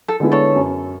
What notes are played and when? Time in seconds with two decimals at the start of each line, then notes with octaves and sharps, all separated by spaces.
0.08 A4
0.20 D3 G#3 B3 E4
0.32 A4 C#5
0.56 F#2